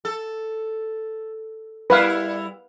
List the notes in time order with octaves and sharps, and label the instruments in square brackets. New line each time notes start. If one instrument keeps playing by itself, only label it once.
[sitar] A4
[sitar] G3 E4 [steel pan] B4 F5